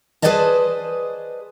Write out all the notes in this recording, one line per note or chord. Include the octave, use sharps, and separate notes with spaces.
G#4 B4 C5 D5 D#5 A5